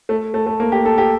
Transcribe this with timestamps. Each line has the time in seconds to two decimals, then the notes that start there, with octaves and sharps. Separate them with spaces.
0.09 A3
0.34 A3
0.47 A3
0.60 A#3
0.72 G4
0.85 A4
0.98 G4